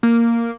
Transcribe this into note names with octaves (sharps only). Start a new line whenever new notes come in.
A#3